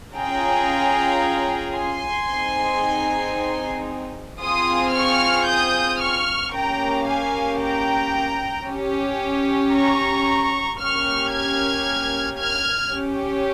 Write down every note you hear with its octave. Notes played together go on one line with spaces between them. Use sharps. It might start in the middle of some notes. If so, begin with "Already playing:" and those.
C#4 F4 G#4 G5 A#5
G#5 C6
C4 D#4 G#4
C4 F4 G#4 C6 D#6
C#6 F6
D#6 G6
C#6 F6
A#3 C#4 G4 G5 A#5
F5 G#5
G5 A#5
C#4 G4
A#5 C#6
A#3 C#4 G4 C#6 F6
F6 G#6
F6 G#6
C#4 G4